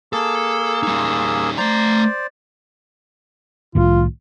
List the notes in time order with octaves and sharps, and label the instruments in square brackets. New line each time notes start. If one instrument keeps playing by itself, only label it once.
[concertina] A#3 G#4 E6 [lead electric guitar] A4
[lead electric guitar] G3 D#4
[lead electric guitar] A3 A#5 [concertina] C5 D5
[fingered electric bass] C2 A2 D#3 [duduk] F4